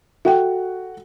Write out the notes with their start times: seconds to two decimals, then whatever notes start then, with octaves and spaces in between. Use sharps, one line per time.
0.25 F#4 A4 E5 F#5 G5